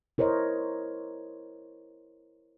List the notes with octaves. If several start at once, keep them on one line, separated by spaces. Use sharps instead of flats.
E4 A#4 C5 C#5 D#5